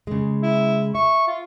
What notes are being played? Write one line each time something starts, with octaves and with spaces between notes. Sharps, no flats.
C#3 G#3
E4
E5 C#6
F4